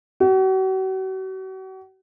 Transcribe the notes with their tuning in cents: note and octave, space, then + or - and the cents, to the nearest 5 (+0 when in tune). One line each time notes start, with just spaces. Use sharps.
F#4 +40